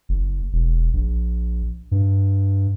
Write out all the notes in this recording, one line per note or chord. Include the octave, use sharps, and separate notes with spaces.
F#1
E1
A#1
G2